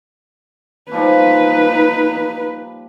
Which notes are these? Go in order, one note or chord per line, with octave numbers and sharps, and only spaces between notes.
A#2 F3 G3 D#4 B4